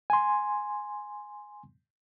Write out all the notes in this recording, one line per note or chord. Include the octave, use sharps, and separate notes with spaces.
G#5 C6